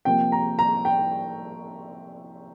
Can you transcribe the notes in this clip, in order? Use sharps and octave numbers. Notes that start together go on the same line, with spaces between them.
C3 F3 A#3 G5
A#5
A#5
G5